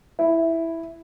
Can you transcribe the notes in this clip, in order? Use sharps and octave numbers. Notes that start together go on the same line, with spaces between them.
E4